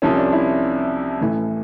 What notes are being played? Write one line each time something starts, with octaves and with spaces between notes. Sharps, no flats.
C2 C3 F3 C#4
D4
E4
A1 A2 E3